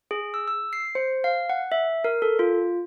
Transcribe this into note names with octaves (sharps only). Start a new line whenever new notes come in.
G#4
E6
E6
C7
C5
F5
F#5
E5
A#4
A4
F4